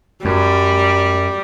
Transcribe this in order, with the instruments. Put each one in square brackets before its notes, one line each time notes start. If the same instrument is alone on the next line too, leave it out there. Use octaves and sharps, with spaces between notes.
[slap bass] F#2 [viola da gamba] G3